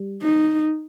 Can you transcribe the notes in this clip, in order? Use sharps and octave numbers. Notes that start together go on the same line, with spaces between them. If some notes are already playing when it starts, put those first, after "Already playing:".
Already playing: G3
D#4